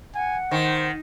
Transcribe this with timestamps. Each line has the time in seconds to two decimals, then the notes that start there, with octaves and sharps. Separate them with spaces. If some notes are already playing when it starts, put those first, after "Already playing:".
0.15 F#5 G#5
0.51 D#3 C5